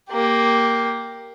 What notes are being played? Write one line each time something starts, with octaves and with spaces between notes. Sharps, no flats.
A#3 G4